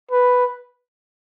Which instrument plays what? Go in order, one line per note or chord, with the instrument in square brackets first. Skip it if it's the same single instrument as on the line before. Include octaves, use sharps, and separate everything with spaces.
[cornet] B4